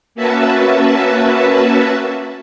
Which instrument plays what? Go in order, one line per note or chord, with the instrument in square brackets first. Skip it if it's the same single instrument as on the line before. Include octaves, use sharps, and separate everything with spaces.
[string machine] A#3 C#4 F#4 B4 E5 A5